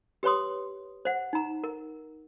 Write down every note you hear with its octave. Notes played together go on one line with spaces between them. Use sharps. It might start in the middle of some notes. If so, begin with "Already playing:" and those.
G4 B4 C#5 C6 D#6
C5 F#5
D#4 A#5
A#4